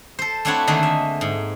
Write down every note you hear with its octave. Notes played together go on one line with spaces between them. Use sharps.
A4 C5
A3 C4 D4 E4 C#5 F#5
D3 D#3 A3 A#3 C4 G#4
E5
G#2